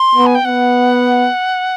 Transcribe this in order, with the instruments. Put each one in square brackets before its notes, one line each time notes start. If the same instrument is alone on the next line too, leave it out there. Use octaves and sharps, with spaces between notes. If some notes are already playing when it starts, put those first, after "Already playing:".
Already playing: [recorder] C6
[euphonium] B3
[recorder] G#5
G5
[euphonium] B3 [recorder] F#5